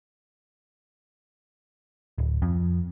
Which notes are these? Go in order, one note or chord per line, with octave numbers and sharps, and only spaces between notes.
D1
F2